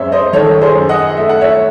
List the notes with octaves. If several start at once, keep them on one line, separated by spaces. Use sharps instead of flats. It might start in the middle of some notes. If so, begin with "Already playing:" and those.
Already playing: F#2 G#3 C5 C#5 E5
C5 D#5
D#3 A4 C#5
G#4 C5
F#2
D#5 F#5
A3 E5
F#5
C#5 E5